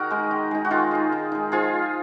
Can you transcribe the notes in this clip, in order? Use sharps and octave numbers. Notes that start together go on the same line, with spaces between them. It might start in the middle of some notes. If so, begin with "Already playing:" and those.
Already playing: D#3 F#4 G#4 A#4
G#3 D#4
D#3
G#3 D#4
F#4
D#3 F4 G#4
G#3 D#4
D#3
G#3 D#4
F3 F4 G#4